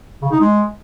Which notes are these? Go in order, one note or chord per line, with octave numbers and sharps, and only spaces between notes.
C#3
D#4
G#3